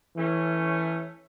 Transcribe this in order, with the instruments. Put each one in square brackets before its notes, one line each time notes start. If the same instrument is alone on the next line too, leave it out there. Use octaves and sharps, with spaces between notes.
[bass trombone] E3 [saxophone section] A3 C#4